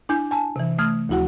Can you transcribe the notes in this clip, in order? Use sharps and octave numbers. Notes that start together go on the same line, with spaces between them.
D4 E4 G#5 D6 G6
G#5 A5
C3 E3
A3 D#6 F6 G#6
D2 F3 E4 F#4 F#5